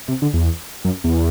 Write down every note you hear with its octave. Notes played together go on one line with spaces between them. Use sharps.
C3
D3
E2
F#2
E2